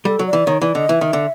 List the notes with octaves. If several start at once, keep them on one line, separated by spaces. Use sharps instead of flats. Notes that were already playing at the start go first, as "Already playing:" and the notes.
G3 A4
F#3
D5
E3
D#3 C#5
E3 D5
D3 D#5
E3 E5
D#3
D3